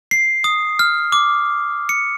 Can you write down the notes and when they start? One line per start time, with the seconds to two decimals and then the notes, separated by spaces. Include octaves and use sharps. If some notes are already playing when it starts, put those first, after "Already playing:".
0.11 C7
0.44 D#6
0.79 F6
1.12 D6
1.89 C#7